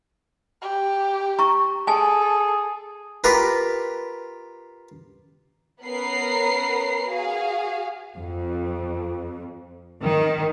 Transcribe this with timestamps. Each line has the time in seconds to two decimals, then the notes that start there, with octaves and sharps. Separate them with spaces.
0.62 G4
1.39 A#5 C#6
1.87 G#4 A4 G#5 A5
3.24 F4 G4 A#4 B4
5.83 B3 C#4 A#4 B4 A#5 C7
7.07 F#4 G#4 F5
8.16 F2
10.01 D#3